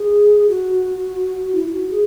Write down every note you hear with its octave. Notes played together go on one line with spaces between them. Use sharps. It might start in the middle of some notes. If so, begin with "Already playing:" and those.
Already playing: G#4
F#4
E4
E4
F#4
G#4